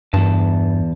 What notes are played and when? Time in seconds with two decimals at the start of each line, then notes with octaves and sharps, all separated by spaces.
0.14 E2 G2 A5